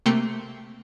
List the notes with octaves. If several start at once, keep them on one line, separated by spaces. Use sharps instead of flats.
C3 A3 A#3 G5 C6 C#7